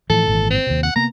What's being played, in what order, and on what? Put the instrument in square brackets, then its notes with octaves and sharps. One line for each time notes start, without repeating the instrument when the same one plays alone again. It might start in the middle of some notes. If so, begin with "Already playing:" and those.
[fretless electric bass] A2 E3 F3 [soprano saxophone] A4
[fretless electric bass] G#1 A#2 E3
[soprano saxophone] C4
[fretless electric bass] D#2 C3
[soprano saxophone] F#5
[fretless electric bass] C3 A#3 B3 [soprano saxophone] A#5